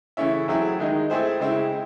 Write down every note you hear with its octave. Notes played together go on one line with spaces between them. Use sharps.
C#3 E3 A3 C#4 E4
F#3 A3 C4 E4 G#4
D#3 G#3 D#4
A3 C4 E4 G#4 C5
C#3 G#3 C4 E4